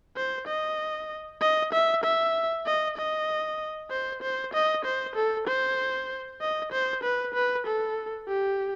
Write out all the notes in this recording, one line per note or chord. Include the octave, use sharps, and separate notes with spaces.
C5
D#5
D#5
E5
E5
D#5
D#5
C5
C5
D#5
C5
A4
C5
D#5
C5
B4
B4
A4
G4